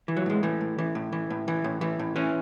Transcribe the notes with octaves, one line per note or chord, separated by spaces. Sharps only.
E3
F#3
A2 G#3
E3 A3
A2
E3
A2
E3
A2
E3
A2
E3
A2
E3 C#4